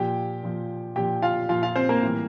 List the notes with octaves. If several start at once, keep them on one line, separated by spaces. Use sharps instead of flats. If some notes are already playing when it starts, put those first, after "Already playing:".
Already playing: A#2 F3 G4 G5
A#2 F3
A#2 F3 G4 G5
F4 F5
A#2 F3 F4 F5
F4 F5
C4 C5
A#3 A#4
A2 E3 G3